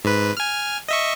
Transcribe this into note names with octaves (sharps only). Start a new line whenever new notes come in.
G#2 B4
G#5 F6
D#5 E5 C#6